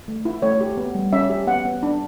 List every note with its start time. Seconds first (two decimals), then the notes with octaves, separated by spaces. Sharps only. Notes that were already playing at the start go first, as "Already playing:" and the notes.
0.08 A3
0.25 E4
0.42 A3 C#5
0.61 G4
0.77 B3
0.95 G3
1.13 C#4 E5
1.30 G4
1.47 B3 F#5
1.65 B3
1.83 D4